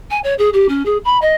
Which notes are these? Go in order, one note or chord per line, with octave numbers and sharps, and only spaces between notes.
G#5
C#5
G#4
G4
C#4
G#4
B5
D#5